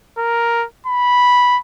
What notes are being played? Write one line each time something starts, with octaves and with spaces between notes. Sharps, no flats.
A#4
B5